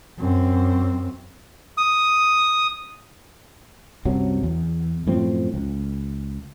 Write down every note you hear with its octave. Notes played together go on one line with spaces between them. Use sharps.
F#2 C4
D#6
C2 F#2 C3 F#3
E2
F#2 A2 F3 C4
C#2